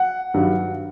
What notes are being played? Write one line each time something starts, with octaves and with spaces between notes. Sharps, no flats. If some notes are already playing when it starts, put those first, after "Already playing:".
Already playing: F#5
G2 D#3 F#3